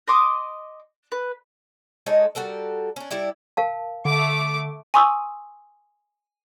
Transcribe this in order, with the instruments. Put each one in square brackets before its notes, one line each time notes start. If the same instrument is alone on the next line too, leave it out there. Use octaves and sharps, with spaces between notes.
[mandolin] D#5 C6 D6 D#6
B4
[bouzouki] G#3 D#4 A4 C#5
G3 F#4 A4 A#4
C#4 D4
G3 D4 E4 G4
[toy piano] A#4 F5 A5
[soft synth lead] D3 [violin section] A3 D6
[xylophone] G#5 C6 C#6 D#6 E6